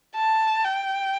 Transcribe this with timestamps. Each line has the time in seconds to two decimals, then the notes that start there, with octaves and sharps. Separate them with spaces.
0.16 A5
0.65 G5